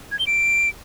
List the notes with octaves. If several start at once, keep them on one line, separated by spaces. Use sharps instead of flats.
G#6
G7
D7